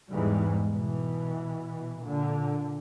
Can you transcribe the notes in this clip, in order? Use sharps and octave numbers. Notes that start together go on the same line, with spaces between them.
E2 G#2 E3 G3 G#3
B2 E3
A#2 D3